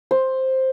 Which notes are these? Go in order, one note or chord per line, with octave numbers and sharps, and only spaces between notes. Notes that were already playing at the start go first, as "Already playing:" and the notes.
C5